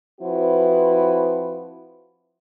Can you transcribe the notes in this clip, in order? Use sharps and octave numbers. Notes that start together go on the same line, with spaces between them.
F3 C4 E4 F#4 B4